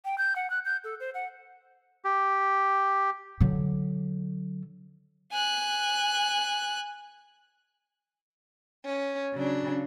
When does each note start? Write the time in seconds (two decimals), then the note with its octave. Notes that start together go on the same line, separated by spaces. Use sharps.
0.05 G5
0.18 G6
0.36 F#5
0.50 F#6
0.65 G6
0.84 A4
1.00 C5
1.14 F#5
2.05 G4
3.40 D3 F#3
5.32 G#5 F#6
8.82 C#4
9.33 C#3 F#3 D4